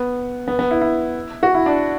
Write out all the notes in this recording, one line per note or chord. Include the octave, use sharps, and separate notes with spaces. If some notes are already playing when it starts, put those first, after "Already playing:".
Already playing: B3
B3
B3
E4
E4
F#4
E4
D4